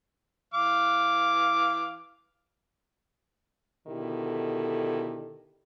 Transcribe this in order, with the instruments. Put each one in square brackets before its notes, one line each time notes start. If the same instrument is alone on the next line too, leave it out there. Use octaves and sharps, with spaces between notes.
[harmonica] E3 F5 D6
[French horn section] B2 D3 D#3 E4 G4 A4